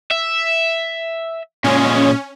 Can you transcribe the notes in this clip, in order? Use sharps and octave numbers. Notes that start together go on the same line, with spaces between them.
E5
A#2 G#3 C#4